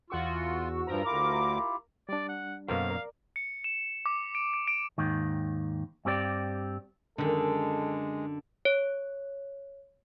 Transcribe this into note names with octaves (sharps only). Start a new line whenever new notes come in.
E2 F4 F#4 C#6 E6
G2 F3 A#4 A#5
D2 E4 F4 G4 D6
G3 D4 D5
F#5
F#2 B2 A#3 F#4 A4 C5 F5
A#4 D5
C#7
E7
D6
D7
D7
D7
D#2 G#2 D#3
G2 C4 G4 G#4 D5
F#2 D3 D#3 G#3 A4
C#5